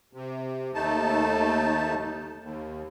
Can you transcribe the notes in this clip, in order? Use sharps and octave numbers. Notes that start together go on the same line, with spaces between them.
C3
D#2 A3 D#4 A5
D#2